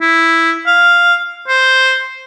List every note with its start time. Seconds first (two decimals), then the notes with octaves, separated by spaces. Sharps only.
0.01 E4
0.67 F5
1.48 C5